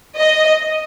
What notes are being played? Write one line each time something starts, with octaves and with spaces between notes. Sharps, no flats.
D#5